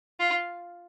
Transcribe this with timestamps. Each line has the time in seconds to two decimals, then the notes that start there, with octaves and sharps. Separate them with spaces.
0.20 F4